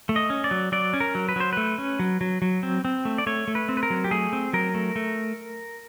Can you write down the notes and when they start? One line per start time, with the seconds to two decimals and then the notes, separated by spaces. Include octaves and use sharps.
0.09 A3
0.16 D#5
0.30 C#4
0.44 D5
0.51 F#3
0.72 F#3 D5
0.93 C#4
1.00 A#4
1.15 F#3
1.29 B4
1.36 F#3 C5
1.53 A3 B4
1.78 C#4
1.99 F#3
2.21 F#3
2.42 F#3
2.63 C4
2.85 C4
3.05 A3
3.18 D5
3.27 A3 C#5
3.48 A3
3.55 B4
3.69 C4
3.77 B4
3.83 A#4
3.90 F#3
4.04 G4
4.11 A3 G#4
4.33 C4
4.53 F#3 A#4
4.74 A3
4.96 A3